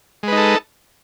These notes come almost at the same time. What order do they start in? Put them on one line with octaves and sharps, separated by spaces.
G#3 B4 D#4 A4